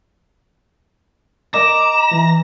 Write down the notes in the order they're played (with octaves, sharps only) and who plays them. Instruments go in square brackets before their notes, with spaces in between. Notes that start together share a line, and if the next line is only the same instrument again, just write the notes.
[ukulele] A#4 D#5 [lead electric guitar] A#5 [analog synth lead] D6 [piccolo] E7
[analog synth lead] E3